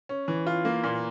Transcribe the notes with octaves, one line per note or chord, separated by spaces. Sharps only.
C#4
E3
F4
A#3
A#2